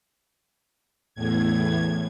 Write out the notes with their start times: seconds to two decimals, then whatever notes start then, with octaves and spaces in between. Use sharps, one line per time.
1.15 E2 A2 G#6